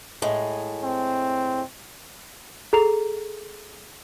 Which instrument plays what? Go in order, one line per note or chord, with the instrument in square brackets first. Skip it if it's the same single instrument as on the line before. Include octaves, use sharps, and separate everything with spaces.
[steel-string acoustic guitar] A2 G#3
[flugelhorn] C4
[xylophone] G#4 A4 A#5 C7 F7